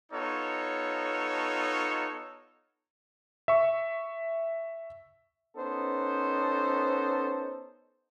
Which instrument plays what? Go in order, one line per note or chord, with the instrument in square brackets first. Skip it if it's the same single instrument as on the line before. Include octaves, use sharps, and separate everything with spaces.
[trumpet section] B3 D#4 F4 A4 C#5
[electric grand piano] E5 C#6
[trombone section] B3 C#4 D#4 A4 C5